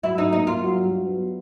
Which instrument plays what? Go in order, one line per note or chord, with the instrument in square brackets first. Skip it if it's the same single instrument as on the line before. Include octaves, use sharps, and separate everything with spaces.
[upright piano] F#3 [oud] E4
[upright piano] A2 [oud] D#4
[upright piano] A#3 [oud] D#4
[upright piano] A#3 [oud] F4
[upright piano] F#3
G2
F#3
B3